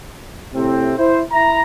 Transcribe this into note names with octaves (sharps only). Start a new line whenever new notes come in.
A2 C3 C4
E4 C5
E4 A#5